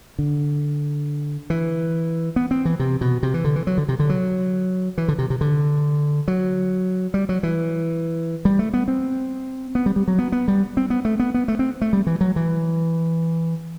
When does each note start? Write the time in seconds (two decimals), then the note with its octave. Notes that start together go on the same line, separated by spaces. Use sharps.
0.19 D3
1.50 E3
2.36 B3
2.51 C4
2.65 E3
2.80 C3
3.01 B2
3.23 C3
3.34 E3
3.44 D3
3.56 E3
3.67 F#3
3.78 D3
3.89 C3
3.99 D3
4.10 F#3
4.98 E3
5.08 D3
5.18 C3
5.30 C3
5.41 D3
6.28 F#3
7.14 G3
7.29 F#3
7.43 E3
8.45 G3
8.59 A3
8.74 B3
8.88 C4
9.75 B3
9.86 G3
9.96 G3
10.08 F#3
10.19 B3
10.32 B3
10.48 G3
10.77 C4
10.90 B3
11.05 A3
11.20 B3
11.34 B3
11.48 A3
11.59 C4
11.82 A3
11.93 G3
12.07 E3
12.21 F#3
12.36 E3